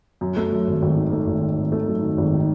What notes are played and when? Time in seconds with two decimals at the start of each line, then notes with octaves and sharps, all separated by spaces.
0.21 F#2
0.37 A3
0.52 F#2
0.67 G#1
0.82 G#1
0.97 D#3
1.12 A3
1.27 G#1
1.42 D#3
1.57 G#1
1.72 A3
1.87 F#2
2.02 D#3
2.18 G#1
2.33 D#3